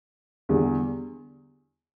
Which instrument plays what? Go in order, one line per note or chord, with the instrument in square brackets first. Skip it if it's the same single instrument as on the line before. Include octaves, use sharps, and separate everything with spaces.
[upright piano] E2 D3 G3